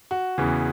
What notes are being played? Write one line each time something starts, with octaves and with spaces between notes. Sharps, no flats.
F#4
E2 C#3 E3